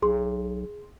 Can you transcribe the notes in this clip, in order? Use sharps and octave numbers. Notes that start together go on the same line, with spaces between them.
B1 G#4 C6